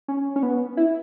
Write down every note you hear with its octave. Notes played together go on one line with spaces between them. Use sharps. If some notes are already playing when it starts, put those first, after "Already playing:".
C#4
C#4
B3
E4